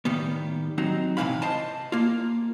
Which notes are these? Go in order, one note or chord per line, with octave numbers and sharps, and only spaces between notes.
A2 D#3 G3 B3
F#3 C4 D#4
B1 G#2 C3 E3 F5 B5
C5 D#5 A5
A#3 F4